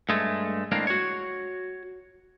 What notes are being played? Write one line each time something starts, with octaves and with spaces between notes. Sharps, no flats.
G2 G#3 A3
A2 G#3 A#3 C4 D4 F5
F#4 C#5